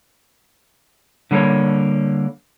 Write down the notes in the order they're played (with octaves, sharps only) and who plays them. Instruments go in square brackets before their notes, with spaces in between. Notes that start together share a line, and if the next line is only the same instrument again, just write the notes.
[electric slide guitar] D3 G3 A#3 A4 C#5